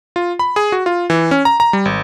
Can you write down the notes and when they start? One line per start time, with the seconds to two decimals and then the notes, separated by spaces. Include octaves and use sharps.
0.16 F4
0.39 B5
0.56 G#4
0.72 F#4
0.86 F4
1.10 E3
1.31 C#4
1.45 A#5
1.60 A#5
1.73 G3
1.85 G#1